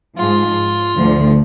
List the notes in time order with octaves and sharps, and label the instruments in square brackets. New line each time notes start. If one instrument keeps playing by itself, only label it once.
[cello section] G#2 F3 G#3 [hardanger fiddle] F4
[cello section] D2 D3 F3